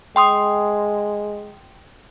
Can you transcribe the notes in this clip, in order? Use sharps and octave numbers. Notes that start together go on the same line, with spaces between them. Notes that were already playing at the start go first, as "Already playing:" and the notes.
G#3 G5 C6 D#6